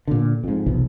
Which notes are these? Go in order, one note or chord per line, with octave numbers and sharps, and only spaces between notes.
A#2 D3
F2 G#2
F1 B1 E2 F3